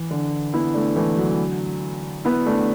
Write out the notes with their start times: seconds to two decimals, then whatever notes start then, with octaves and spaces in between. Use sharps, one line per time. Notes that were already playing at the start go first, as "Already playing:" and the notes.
Already playing: E3
0.11 D3
0.54 B3 E4
0.74 A3 D4
0.96 E3 A3
1.17 D3 F#3
2.25 B3 E4
2.46 A3 D4